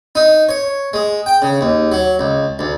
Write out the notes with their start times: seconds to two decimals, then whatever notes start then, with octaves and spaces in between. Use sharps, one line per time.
0.15 D#4
0.49 C#5
0.93 G#3
1.26 G5
1.42 C#3
1.61 D#2
1.92 F#3
2.19 C#2
2.59 D2